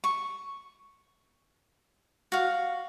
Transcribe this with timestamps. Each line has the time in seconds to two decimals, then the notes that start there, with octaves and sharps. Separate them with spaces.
0.04 C#6
2.32 F#4 F5